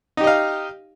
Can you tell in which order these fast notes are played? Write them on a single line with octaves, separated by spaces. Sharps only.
D#4 G4 D#5 F5